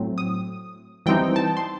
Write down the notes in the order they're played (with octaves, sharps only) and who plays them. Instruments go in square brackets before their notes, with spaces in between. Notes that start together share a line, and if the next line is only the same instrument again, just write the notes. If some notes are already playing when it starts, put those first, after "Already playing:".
Already playing: [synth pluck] A2 F#3 A3 C4
D#6
E3 G3 C4 D#4 G5
A5
C6